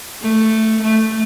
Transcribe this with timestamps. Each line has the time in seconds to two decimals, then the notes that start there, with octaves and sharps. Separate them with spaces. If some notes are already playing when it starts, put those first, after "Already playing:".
0.21 A3
0.82 A3